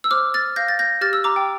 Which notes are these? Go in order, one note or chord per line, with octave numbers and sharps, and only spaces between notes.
E6
C5 D6 F6
F6 A6
F5 G6 A#6
A6
G6 A#6
G4 F6 A6
E6
A#5 D6
G5